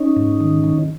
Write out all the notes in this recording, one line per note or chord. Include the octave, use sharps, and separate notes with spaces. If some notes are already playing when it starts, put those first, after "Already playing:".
Already playing: C#4 D#4
G#2
D#3
D#3